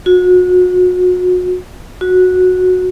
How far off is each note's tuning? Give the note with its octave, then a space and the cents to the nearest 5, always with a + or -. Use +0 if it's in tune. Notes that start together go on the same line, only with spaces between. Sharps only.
F#4 -35
F#4 -10